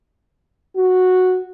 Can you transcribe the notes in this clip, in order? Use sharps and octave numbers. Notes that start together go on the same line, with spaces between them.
F#4